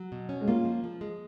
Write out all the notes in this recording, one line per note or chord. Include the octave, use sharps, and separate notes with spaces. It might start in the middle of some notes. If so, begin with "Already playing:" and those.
Already playing: F#3
B2
C#4
G#3
A#3 F4
F3
F3
G#3